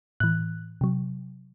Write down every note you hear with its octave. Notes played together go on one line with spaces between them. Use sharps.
A2 E3 F#6
C3 F#3